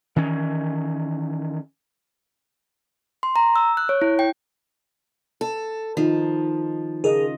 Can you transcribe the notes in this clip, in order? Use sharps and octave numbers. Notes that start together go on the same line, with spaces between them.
D#3 E3 C#4
C6
A#5
E6
F#6
C#5
E4
G5
A4
D#3 F3 D#4
C#3 F4 G#4 A#4 D#5